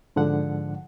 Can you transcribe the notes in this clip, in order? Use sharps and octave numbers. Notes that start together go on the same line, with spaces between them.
G#2 D3 F3 F#5